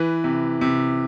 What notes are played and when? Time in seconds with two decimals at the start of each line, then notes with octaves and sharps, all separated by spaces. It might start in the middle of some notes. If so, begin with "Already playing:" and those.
Already playing: E3 B4
0.24 C3
0.61 C3